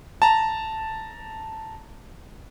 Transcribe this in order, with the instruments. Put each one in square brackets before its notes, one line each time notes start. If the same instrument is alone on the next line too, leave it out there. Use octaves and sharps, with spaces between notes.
[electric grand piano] A5 A#5